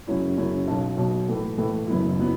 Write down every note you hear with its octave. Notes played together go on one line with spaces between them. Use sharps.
F#2 C#3 F#3 C#4 E4
F#2 C#3 F#3 C#4 E4
B1 B2 F#3
B1 B2 F#3
A2 E3 A3
A2 E3 A3
F#1 F#2 F#3 B3 E4
F#3 B3 E4